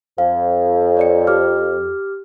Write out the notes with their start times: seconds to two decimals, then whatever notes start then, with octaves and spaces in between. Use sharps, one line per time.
0.18 F2 F5
0.97 C#5 D5 C#7
1.27 G4 D6 F6